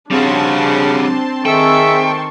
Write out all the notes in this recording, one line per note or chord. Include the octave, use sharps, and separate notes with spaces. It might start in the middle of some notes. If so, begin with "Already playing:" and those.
C#3 G3 C4 D4 F#4 A5 C6
D#3 G#4 A4 E5 G5 C#6